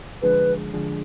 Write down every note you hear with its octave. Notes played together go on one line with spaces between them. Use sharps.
D3 F3 G#3 D4 G#4 B4
D3 F3 G#3 D4 G#4